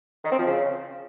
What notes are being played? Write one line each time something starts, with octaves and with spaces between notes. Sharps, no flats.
D#3
C4
F3
C#3